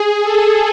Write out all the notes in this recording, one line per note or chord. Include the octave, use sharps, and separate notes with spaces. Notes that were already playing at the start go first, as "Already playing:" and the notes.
Already playing: G#4
A4